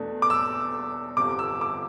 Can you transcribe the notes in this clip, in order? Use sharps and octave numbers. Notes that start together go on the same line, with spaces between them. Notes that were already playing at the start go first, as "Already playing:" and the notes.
Already playing: E2 B2 A3 D4
D6
E6
G1 F2 C3 D6
E6
D6